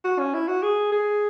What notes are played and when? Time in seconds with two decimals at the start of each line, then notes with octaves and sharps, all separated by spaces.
0.04 F#4
0.19 C#4
0.34 E4
0.48 F#4
0.63 G#4
0.92 G#4